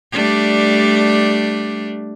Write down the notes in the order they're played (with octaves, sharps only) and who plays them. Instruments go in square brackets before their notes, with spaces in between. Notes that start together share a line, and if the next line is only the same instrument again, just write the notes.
[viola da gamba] G3 A3 D4